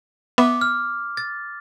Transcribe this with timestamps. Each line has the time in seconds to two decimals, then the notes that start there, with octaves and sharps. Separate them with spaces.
0.38 B3 E5 D6
0.61 F6
1.17 A6